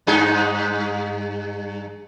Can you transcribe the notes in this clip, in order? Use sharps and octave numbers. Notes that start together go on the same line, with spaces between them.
G2 D#4 G#4